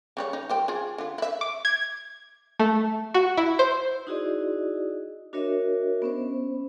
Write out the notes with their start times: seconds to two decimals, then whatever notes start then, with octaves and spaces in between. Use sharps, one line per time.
0.17 C#3 G3 C#5
0.33 D#4
0.49 G3 C5 G5
0.68 F4 G#4
0.98 D3 F4
1.18 E4 E5
1.41 D6
1.65 G#6
2.59 A3
3.14 F#4
3.37 E4
3.59 C5
4.07 D#4 E4 F#4 G#4 D5 D#5
5.33 D4 F#4 A#4 C#5 D#5 E5
6.02 B3 C#4 C5